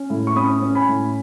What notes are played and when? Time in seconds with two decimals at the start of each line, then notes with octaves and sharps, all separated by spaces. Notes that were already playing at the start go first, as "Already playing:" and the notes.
Already playing: C#4
0.10 A2
0.27 C#6
0.36 C#4 B5 D#6
0.62 C#4
0.75 G#5 B5
0.88 A2